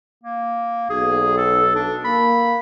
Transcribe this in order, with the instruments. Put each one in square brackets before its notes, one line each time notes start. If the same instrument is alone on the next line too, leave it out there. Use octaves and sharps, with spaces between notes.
[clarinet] A#3
[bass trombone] B1 [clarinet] G#4
[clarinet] A4
D4
[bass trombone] A#3 [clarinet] B5